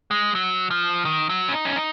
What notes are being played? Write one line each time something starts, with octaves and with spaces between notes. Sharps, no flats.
G#3
F#3
F3
D#3
F#3
C#4
D#4
C#4
D#4